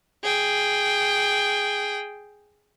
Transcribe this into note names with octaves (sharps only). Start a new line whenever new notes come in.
G#4 G5